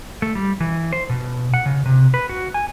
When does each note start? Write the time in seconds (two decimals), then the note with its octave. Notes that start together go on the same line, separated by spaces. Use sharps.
0.22 A3
0.35 G3
0.60 E3
0.93 C5
1.09 B2
1.54 F#5
1.66 C#3
1.86 C3
2.14 B4
2.29 F#4
2.54 G#5